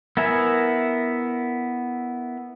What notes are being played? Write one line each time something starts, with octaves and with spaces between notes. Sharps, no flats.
B3 E4 A#4 E5 G#5